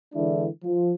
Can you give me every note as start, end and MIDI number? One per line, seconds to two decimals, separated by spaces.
0.15 0.46 50
0.15 0.46 52
0.15 0.46 56
0.15 0.46 62
0.15 0.46 64
0.64 0.92 53